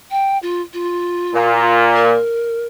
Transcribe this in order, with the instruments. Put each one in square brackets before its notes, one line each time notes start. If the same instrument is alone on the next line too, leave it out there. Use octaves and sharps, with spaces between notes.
[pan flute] G5
F4
F4
[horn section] A#2
[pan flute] A#4